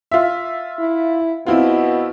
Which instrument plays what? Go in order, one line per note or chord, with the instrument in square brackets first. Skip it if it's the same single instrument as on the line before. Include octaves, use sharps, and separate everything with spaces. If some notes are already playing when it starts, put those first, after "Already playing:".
[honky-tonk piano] F4 E5
[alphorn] E4
[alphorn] B2 [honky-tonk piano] C4 E4 F4